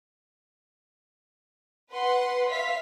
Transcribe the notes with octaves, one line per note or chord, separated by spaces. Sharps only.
B4 F#5 C6
E5 F5 B6